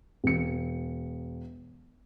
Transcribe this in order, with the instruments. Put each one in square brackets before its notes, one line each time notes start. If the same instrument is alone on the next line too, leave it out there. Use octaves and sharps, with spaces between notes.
[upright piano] E1 C#7